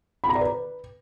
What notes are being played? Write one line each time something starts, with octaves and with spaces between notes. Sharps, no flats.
B5
A#5
D5
B4